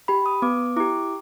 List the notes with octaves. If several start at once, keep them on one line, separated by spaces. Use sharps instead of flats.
G4 B5
D#6
B3 D6
E4 G4 D6